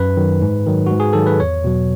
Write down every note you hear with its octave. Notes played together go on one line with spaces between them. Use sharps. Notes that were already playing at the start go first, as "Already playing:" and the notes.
Already playing: F#2 B4
D#3 F#3
G#2
D#3 F#3
G#2 F#4
G#4
D#3 F#3 A4
B4
E2 C#5
B2 F#3